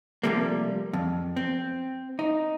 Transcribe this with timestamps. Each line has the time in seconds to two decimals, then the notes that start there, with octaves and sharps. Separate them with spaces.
0.23 C3 F3 G3 A3 A#3
0.93 F2
1.36 C4
2.19 D#4